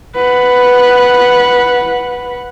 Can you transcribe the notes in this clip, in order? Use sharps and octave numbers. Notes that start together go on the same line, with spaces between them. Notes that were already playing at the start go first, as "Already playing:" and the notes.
B4 F#5